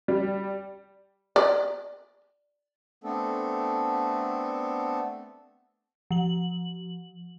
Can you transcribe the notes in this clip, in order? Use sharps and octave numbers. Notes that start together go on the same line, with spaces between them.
G3
D5
A3 B3 C4 D4 A4
F3 F#7